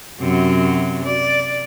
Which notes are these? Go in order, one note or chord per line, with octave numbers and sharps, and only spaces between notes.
F#2 C3 F#3
D5